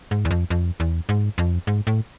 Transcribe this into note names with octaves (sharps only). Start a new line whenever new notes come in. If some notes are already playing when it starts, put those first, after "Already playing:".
G#2
E2
F2
F2
E2
G#2
F2
G#2
A2